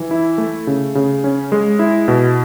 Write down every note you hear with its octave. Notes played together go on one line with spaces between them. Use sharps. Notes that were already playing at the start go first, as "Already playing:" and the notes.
Already playing: E3
E4
A3
C#3
C#3
C#4
G#3
E4
B2